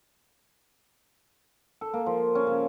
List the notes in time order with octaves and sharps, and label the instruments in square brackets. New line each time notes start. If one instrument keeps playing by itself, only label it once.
[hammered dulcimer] A4
A#3
F3
C#4
C#3